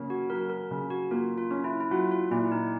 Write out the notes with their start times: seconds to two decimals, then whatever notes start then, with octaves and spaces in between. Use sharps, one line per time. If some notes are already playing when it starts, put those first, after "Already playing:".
Already playing: C#3 A#3 C#4
0.10 F#4
0.30 F#3 A#4
0.50 A#4
0.71 C#3
0.90 F#4
1.11 A#3 F4
1.38 F4
1.51 C#4
1.64 E4
1.80 E4
1.91 F#3 F4
2.11 F4
2.31 A#2 E4
2.52 D#4